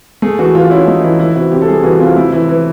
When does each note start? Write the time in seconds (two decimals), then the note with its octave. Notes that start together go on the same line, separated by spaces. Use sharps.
0.22 A3 G#4
0.38 E3 F#4
0.55 E3 F4
0.71 C#4 E4
0.87 A3 D#4
1.03 E3 E4
1.19 E3 E4
1.35 C3 F#4
1.52 C3 G4
1.62 A4
1.68 G3 G#4
1.84 E3 F#4
2.00 C3 F4
2.16 A3 E4
2.32 E3 E4
2.49 E3